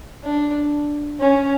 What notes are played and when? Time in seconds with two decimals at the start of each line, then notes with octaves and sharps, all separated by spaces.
0.24 D4
1.20 C#4